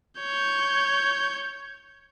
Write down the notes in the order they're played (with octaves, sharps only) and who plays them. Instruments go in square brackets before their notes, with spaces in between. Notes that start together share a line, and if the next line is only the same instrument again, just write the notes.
[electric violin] C#5 G6